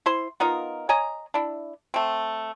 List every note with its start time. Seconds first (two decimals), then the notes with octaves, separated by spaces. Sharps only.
0.06 E4 C5 C6
0.40 B3 D#4 F4 A#4
0.89 C#5 D#5 G#5 A#5
1.34 D4 E4
1.94 A3 C4